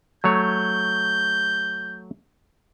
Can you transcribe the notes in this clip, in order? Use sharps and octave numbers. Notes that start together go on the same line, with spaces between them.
F#3 A3 C#5 G6